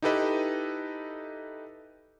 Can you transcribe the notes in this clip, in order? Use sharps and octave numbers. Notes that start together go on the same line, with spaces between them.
D#4 E4 G4 A4 B4 D#5